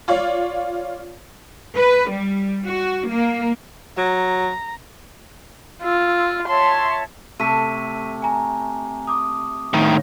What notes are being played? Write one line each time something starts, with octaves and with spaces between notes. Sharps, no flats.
F4 C#5 D5 F5
B4
G3
F#4
A#3
F#3 A#5
F4 E6
C#5 E5 A5 C6
C3 A3 A5 C#6 B6 D#7
G#5 A#5
D6 D#6
A2 D#3